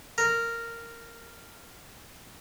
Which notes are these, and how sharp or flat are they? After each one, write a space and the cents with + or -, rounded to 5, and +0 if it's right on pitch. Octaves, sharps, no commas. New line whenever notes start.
A#4 -10